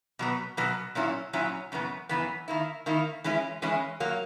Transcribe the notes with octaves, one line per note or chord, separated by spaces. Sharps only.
B2 F#3 B3
B2 F#3 B3
A#2 F#3 C#4 E4
A#2 F#3 C#4 E4
F#2 C#3 E3 B3
F#2 C#3 E3 B3
D#3 A#3 E4
D#3 A#3 E4
E3 G#3 C#4 E4
E3 G#3 C#4 E4
F#3 A#3